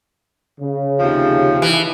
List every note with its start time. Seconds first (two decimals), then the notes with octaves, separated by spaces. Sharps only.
0.60 C#3
1.00 D#2 C3 F3
1.62 E3